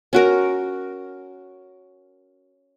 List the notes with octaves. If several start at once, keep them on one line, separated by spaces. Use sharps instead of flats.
C#4 F#4 A#4